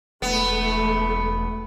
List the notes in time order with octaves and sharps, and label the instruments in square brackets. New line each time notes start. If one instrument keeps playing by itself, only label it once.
[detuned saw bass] E1 [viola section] A3 [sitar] B3